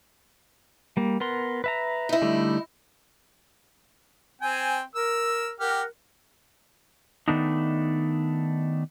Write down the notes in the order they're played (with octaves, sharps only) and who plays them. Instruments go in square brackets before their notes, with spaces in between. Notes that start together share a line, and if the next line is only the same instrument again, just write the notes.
[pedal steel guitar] G3 A#3
B3 A#4 C6
B4 E5 A#5
[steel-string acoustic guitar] D#4 E4
[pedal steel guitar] D3 G3 A3
[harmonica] C4 G5 [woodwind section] G#5
[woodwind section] A#4 [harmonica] E6
[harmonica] G4 F6 [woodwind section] A#4 F#5
[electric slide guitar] D#3 A3 B3 D4 D#4